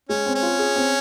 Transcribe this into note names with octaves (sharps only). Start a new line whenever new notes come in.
G#3 C#4
C4
C#4
F4
G#4
C4